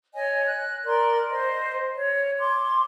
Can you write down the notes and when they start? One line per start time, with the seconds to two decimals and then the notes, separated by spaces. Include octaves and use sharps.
0.15 C#5 D#5 G#5
0.47 F#6
0.85 A#4 D5 C6
1.30 C5 D#5
1.97 C#5
2.39 C6 D6